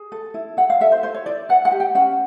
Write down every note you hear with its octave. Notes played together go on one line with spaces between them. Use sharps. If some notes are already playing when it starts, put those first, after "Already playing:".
Already playing: G#4
A4
E4
E4 F#5
F5
A4 E5
C5
E4 C5
C#5
E4 D5
B4 F#5
F#5
G4
G5
C#4 F#5